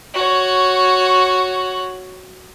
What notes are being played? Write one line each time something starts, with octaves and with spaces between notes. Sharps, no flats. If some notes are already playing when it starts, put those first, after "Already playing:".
F#4 C#5